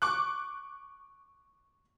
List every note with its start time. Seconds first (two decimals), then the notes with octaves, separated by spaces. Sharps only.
0.02 C#6 D6 F#6